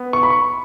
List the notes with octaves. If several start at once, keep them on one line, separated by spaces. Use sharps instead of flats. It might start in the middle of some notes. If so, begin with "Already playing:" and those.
Already playing: B3
C#6
B5
C#6